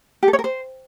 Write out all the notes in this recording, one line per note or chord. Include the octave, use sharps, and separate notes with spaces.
G4
A4
C#5
A#4
C5